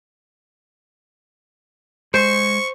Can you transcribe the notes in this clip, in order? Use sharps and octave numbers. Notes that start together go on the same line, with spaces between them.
G#3 C5 C#6